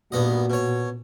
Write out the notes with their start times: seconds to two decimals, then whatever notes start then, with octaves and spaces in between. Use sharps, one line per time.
0.12 G2 A#2 B3 F#4 D#5
0.50 B2 C#5